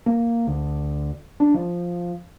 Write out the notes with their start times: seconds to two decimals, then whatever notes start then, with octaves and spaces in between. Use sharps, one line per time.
0.06 A#3
0.47 D2
1.40 D4
1.54 F3